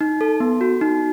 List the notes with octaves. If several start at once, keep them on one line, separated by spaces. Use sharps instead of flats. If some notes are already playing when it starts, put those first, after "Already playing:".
D#4
A4
B3
F#4
D#4